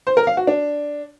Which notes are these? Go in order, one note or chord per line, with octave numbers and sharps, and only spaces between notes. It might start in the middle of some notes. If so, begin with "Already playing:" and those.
C5
A#4
F5
F#4
D4